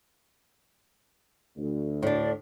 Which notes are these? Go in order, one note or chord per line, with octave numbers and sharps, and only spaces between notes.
D2
A2 D4 D5